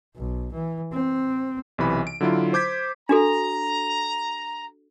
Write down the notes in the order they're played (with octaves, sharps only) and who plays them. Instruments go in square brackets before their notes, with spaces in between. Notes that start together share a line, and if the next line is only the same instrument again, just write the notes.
[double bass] B1
E3
C4
[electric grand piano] B1 C3 E3 B5
D7
D3 F#3 E4 F4
C5 D6 G6 G#6 B6
[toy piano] D4 F#4 A4 [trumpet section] A#5